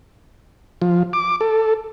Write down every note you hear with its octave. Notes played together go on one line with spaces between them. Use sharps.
F3
D6
A4